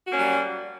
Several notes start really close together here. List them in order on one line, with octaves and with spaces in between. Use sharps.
F#4 A#3 C#4 F#3 G3